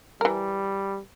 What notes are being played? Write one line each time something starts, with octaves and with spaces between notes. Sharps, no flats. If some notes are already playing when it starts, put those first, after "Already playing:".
E3 G3 A#4